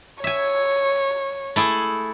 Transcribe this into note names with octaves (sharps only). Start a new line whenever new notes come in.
C#5 E5 G#5
A3 E4 G#4